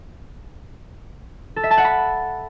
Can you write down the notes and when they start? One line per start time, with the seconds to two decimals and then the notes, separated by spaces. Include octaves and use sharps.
1.56 A4
1.63 E5
1.70 A5
1.77 F#5
1.84 B5